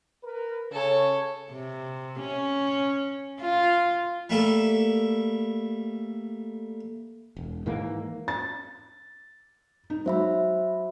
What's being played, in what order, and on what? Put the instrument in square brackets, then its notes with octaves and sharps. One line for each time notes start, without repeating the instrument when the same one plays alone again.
[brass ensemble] A#4 B4
[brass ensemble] C#3 [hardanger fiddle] A4 C#5
[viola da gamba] C3
C#4
F4
[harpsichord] G3 A3 A#3 A4
[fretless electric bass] E1
G#2 D#3 E3 A#3
[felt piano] A6
D#4
[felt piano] F#3 [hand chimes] C5 E5 B5